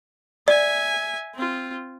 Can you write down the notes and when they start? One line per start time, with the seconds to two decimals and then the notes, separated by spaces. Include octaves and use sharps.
0.48 D5 E5 G#5
1.35 C4 F4